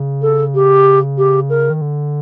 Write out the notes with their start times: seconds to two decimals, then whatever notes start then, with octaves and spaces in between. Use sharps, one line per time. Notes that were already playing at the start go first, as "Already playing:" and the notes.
Already playing: C#3
0.22 A4
0.55 G4
1.18 G4
1.50 A#4
1.70 D#3
1.81 D3